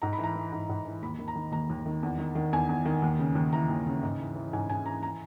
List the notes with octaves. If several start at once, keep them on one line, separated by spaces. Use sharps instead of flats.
G#2 A#5
B5
E3
A#5
E3
G#2
G#2
E3
D#2 B5
D#3
A#5
D#3
D#2 A#5
D#2
D#3
E2
D#3
D#3
E2 G#5
E2
D#3
D#2
C#3
D#2
E3 A#5
D#2
C#3
G#2
E3
E3
G#2 G#5
G#2 G#5
E3 A#5
A#5